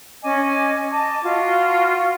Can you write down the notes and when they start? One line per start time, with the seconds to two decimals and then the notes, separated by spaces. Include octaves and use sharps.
0.24 C#4 D#5 G#5 D6
0.91 D#5 A5 D6
1.22 F4 F#4